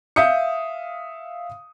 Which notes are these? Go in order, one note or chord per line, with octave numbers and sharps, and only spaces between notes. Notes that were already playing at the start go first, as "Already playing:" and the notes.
E5 F5 D#6 G6 C#7